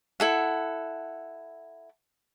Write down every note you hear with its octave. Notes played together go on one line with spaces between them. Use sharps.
E4 A4 F#5